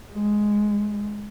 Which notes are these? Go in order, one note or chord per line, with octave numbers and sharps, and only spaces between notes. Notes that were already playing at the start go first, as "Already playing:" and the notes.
G#3